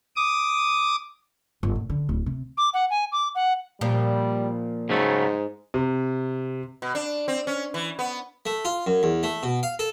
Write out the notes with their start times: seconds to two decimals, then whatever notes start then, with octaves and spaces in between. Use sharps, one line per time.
0.16 D6 D#6
1.63 G1
1.75 A#2
1.90 D3
2.09 D1
2.26 C3
2.57 D6
2.74 F#5
2.90 G#5
3.12 D6
3.35 F#5
3.81 A#2 F3 G3
4.89 G#2 C#3 F#3 A3
5.74 C3
6.82 B2
6.95 D4
7.28 C4
7.47 C#4
7.74 E3
7.99 B3
8.46 A3
8.65 F4
8.86 F#2
9.03 E2
9.23 A3
9.43 B2
9.63 F5
9.79 A4